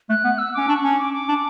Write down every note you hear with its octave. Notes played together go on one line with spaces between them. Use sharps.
A3 F#6
B3
E6
C#4 D6
D4 C#6
C#4
D6
D6
D4